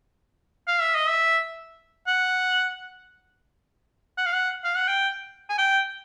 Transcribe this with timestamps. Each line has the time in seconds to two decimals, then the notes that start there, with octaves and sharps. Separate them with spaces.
0.67 F5
0.81 E5
0.95 D#5
1.09 E5
2.07 F#5
4.18 F#5
4.26 F5
4.34 F#5
4.64 F5
4.76 F#5
4.88 G5
5.49 G#5
5.58 G5